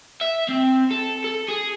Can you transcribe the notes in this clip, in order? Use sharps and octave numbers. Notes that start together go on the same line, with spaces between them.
E5
C4
A4
A4
G#4